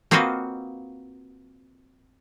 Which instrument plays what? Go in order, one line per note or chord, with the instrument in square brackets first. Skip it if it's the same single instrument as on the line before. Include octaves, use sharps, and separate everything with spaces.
[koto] A#3 C4 F4 F#4 B4 D#5